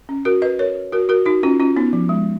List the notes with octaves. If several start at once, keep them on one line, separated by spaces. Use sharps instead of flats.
C#4
F#4 A#4
B4 D#5
A#4 C#5
F#4 A#4
F#4 A#4
D#4 F#4
C#4 F4
C#4 F4
B3 D#4
F3
G#3